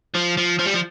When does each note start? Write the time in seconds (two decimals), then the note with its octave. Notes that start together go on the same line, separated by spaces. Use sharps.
0.14 F3
0.37 F3
0.59 F3
0.66 G3
0.74 F3